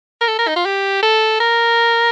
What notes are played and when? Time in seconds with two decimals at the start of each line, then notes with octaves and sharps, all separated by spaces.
0.21 A#4
0.28 A4
0.38 A#4
0.47 D#4
0.56 F4
0.65 G4
1.02 A4
1.40 A#4